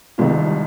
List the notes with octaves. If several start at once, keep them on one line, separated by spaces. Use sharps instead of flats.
C2 C3 D#3 G#3 C4 F4